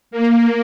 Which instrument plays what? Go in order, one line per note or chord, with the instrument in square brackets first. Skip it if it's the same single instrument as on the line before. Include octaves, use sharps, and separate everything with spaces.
[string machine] A#3